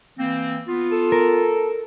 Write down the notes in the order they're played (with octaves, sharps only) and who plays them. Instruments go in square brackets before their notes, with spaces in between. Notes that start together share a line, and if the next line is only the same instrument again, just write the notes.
[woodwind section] E3 A#3 C4
B3 F4
[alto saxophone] A4
[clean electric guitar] A#4